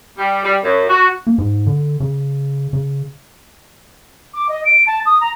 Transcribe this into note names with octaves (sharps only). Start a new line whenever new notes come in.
G3
G3
F#2
F#4
A#3
G#2
D3
C#3
C#3
D6
D#5
D7
A5
D#6
A#5